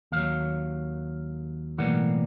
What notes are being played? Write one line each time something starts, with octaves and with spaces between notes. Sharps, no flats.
D#2 D#3 F#3 F5
B1 A2 E3 G3 A#3 F#5